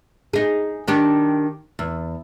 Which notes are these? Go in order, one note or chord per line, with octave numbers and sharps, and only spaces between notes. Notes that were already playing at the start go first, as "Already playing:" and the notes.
D#4 G#4
D#3 D4 G4
E2